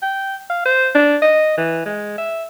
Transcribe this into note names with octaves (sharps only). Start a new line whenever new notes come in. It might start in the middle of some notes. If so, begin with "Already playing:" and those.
G5
F5
C5
D4
D#5
E3
G#3
E5